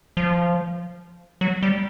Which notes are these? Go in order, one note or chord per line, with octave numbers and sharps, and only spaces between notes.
F3
F#3
G3